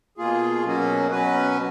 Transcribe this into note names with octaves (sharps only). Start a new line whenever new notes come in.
B2 A#3 F4 G#4
B2 F#3 A#3 C#4 F#4
B2 F#3 C#4 F#4 B4